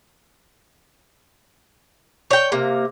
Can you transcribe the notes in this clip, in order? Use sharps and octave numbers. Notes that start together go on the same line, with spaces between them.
C#5 G5
C3 A#3